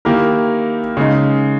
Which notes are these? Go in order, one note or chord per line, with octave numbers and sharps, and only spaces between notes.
D#3 A#3 E4 G4 A#4
C#3 G#3 D#4